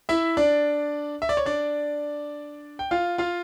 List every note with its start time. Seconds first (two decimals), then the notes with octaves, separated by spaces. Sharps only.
0.09 E4 E5
0.37 D4 D5
1.22 E5
1.29 D5
1.37 C#5
1.46 D4 D5
2.79 G5
2.91 F4 F5
3.18 F4 F5